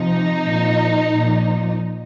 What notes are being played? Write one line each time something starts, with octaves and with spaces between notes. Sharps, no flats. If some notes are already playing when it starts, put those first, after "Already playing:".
Already playing: C3 F3 D#4
A#2 F3
A#2
F3